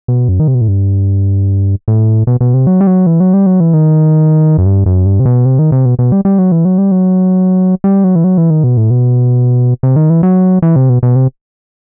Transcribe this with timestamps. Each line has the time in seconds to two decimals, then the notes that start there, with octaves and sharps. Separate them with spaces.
0.08 B2
0.29 F#2
0.40 D#3
0.48 C3
0.55 B2
0.61 A2
0.68 G2
1.88 A2
2.27 B2
2.41 B2
2.54 C3
2.67 F#3
2.81 G3
2.87 F#3
3.07 E3
3.20 F#3
3.34 G3
3.46 F#3
3.60 E3
3.73 D#3
4.58 F#2
4.66 G2
4.86 F#2
5.06 G2
5.20 C3
5.25 B2
5.45 C3
5.59 D#3
5.72 C3
5.86 B2
5.99 B2
6.12 G3
6.25 G3
6.38 F#3
6.52 E3
6.65 F#3
6.78 G3
6.91 F#3
7.84 G3
8.04 F#3
8.15 E3
8.24 F#3
8.38 E3
8.50 D#3
8.64 B2
8.77 A2
8.90 B2
9.83 C3
9.96 D#3
10.10 E3
10.23 F#3
10.62 E3
10.76 C3
10.89 B2
11.03 B2
11.16 C3